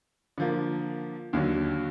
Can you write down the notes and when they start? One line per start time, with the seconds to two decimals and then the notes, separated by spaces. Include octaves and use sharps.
0.38 D3 F3 A#3
1.33 D#2 D3 F#3